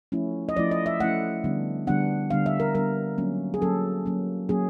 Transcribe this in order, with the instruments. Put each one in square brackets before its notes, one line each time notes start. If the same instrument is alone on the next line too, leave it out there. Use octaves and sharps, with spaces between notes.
[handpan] F3 A3 C#4 E4
D#5
F3 A3 C#4 E4 D5
D#5
E5
F3 A3 C#4 E4 F#5
D3 G3 B3 D4
D3 G3 B3 D4 F#5
D3 G3 B3 D4 F5
E5
A#4
D3 G3 B3 D4 A#4
F#3 A#3 C#4
G#4
F#3 A#3 C#4 A4
F#3 A#3 C#4
F#3 A#3 C#4 G#4